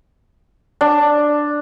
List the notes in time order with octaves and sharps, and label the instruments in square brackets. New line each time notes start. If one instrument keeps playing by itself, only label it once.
[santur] D4